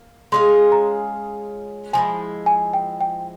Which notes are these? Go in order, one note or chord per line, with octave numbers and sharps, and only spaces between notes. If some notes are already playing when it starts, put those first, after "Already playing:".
Already playing: A#3
G#3 C#4 F4 G#4 C6
A#5
F3 G#3 E4 G#5
G#5
G5
G5